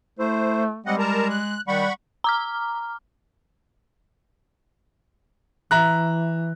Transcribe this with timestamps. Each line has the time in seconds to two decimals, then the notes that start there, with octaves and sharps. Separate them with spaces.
0.19 A3 E4 C5
0.86 G3 G#3 C4 D#5 F#5
0.99 A#4 A5 A#5
1.30 F#6
1.68 D#3 G3 F#5 B5 C#6
2.24 A#5 D6 F6
5.71 E3 E5 A#5 F#6